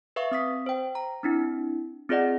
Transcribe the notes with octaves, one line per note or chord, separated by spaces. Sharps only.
B4 E5 F5 C#6
C4 D#6 B6
C5 G5
A#5
C4 D4 E4
C4 F4 G#4 D5 D#5 F#5